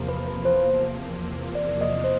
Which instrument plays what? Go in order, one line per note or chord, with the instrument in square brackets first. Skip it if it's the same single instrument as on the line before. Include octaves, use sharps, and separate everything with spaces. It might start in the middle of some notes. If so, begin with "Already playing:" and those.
Already playing: [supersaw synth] E2 C3 F3 A#3
[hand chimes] B4
B4
C5
D5
D#5
C5